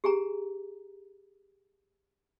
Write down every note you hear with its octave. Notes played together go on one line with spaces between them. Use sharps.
G4 G#4 G#5 A#5